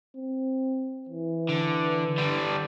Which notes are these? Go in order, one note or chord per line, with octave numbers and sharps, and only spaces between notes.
C4
E3
D3
D3 G3